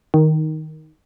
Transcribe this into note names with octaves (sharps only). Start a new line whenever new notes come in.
D#3